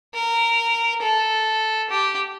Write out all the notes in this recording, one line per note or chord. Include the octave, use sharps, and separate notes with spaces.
A#4
A4
G4